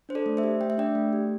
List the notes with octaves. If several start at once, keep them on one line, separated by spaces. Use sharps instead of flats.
D4 C5
A4 D5
A3
C5 E5
G4
A3 G5
E5
D4 D5 G5
A3
G4